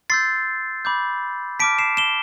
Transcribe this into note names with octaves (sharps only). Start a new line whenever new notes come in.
C6 E6 G6 A6 C7
B5 D6 G6
A5 D6 F6 B6 D7
C7 E7
E7 G7